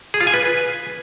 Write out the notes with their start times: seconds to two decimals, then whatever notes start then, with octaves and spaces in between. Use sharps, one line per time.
0.14 G#4
0.21 F4
0.27 G#5
0.34 B4